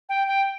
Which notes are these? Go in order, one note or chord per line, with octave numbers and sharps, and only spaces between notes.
G5
G5